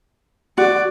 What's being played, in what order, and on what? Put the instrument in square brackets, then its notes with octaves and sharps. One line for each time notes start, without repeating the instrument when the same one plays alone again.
[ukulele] F#4 [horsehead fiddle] D5